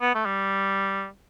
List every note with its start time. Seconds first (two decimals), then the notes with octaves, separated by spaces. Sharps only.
0.01 B3
0.15 A3
0.25 G3